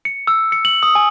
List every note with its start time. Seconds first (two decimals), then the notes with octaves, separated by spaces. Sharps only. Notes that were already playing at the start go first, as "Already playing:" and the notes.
0.05 C#7
0.27 E6
0.52 C#7
0.65 F#7
0.83 D#6
0.95 G#5